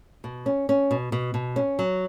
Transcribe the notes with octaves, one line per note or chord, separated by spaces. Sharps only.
B2
C#4
C#4
B2
B2
B2
C#4
F#3